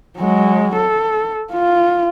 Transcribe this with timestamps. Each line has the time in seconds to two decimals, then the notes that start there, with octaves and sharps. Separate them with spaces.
0.18 F#3 G#3
0.76 A4
1.53 F4